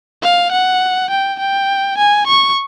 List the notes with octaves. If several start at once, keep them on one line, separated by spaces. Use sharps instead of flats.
F5
F#5
G5
G5
G#5
C#6